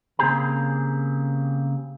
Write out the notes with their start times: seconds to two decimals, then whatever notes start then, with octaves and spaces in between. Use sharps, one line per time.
0.19 C#3 A#3 C4 G4 G#4 A#5